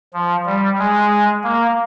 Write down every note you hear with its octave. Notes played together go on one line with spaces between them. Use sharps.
F3
G3
G#3
A#3